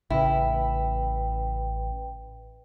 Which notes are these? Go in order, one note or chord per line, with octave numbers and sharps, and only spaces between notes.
A1 C#3 E4 B4 G5